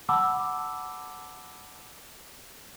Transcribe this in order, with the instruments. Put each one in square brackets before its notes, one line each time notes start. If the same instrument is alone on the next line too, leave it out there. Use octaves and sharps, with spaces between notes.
[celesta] F#5 A5 B5 D6 E6